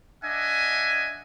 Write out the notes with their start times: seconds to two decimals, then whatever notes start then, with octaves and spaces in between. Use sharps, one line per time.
0.23 D4 D#5 E5 F#5 G#5